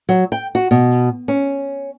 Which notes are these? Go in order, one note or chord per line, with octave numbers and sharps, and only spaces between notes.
F#3
G5
F#4
B2
C#4